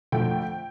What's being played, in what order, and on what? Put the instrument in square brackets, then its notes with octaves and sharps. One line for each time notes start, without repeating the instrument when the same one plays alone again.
[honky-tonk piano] F2 D3 F3 A3 G5